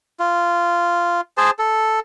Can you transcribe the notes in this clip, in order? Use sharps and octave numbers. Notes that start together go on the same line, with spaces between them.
F4
G#4 C5 A5
A4